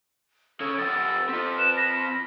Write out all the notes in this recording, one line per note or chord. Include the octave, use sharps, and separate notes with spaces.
C#3 A4 G#6
F2 F#5 A6
C4 F4 B6
B4 E7
B5 A#6